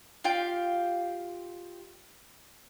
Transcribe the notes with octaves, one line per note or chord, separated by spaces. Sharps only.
F4 G4 F5 G5